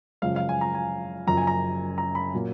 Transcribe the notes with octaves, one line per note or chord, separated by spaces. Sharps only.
F#2 C#3 F3 G#3 F5
F5
G#5
A#5
G#5
F#1 F#2 F3 A#5
G#5
A#5
A#5
B5
A#2 F#3 A#3